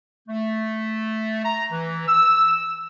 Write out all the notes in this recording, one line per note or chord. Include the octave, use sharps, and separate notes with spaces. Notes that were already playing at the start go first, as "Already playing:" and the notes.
A3
A#5
E3
E6